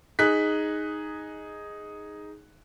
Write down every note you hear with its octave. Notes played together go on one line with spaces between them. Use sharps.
D#4 G#4 F#6 B6